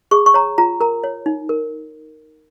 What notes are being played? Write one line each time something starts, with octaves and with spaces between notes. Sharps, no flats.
G#4 C#6
C#6
C#5 A#5
F4 A#5
A#4 A#5
C#5
D#4
A#4